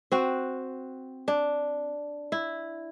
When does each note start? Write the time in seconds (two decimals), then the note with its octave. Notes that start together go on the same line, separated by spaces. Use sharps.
0.12 C4 F#4
1.28 D4
2.32 E4